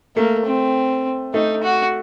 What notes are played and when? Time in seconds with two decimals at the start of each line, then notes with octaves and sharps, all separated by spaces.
0.16 A3 A#3
0.46 C4
1.34 A3 D#4
1.63 F#4